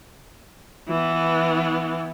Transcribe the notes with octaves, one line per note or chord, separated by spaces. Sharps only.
E3 B3